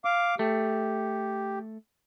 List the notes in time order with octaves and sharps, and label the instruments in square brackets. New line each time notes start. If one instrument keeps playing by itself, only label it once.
[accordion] F5 D6
[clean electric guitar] A3 [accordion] G4